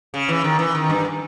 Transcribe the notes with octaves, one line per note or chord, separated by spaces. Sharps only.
C#3
E3
D#3
E3
D#3
G2